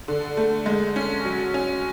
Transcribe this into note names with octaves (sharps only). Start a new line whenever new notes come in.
D3
A3
G#3
C#4
F#3
C#4